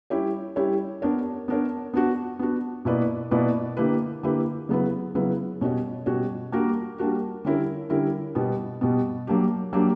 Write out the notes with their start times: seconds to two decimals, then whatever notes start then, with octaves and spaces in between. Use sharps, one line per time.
0.10 G3 C#4 E4 G4 C#5
0.56 G3 C#4 E4 G4 C#5
1.02 B3 D4 A#4 C#5
1.48 B3 D4 A#4 C#5
1.94 B3 D4 F#4
2.39 B3 D4 F#4
2.85 B2 A#3 E4 B4 D5
3.31 B2 A#3 E4 B4 D5
3.77 D3 A#3 E4 G4 B4
4.23 D3 A#3 E4 G4 B4
4.69 C#3 F#3 B3 E4 B4
5.15 C#3 F#3 B3 E4 B4
5.61 B2 G3 C#4 F#4 C#5
6.06 B2 G3 C#4 F#4 C#5
6.52 G3 A#3 D4 F#4 A#4
6.98 G3 A#3 D4 F#4 A#4
7.45 D3 G3 C#4 E4 A#4
7.90 D3 G3 C#4 E4 A#4
8.35 B2 G3 B3
8.81 B2 G3 B3
9.27 F#3 A#3 D4 G4
9.73 F#3 A#3 D4 G4